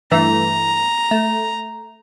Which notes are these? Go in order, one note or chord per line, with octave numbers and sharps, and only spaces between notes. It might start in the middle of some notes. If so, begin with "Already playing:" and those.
G2 E3 A3 A#5
A3